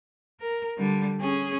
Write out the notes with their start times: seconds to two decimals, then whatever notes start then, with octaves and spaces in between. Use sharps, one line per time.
0.41 A#4
0.78 D3 G3
1.21 C#4 G#4